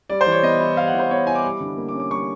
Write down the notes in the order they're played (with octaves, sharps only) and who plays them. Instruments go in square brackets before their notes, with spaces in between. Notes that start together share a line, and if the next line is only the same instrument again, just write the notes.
[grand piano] G3 D5
C5
E3
C#5
B3 D#5
E4
G3 F5
F#5
E3
C5
B3 C#5
E4 G#5
D6
G3
D3
A#3
D6
C#4
D6
G3 C#6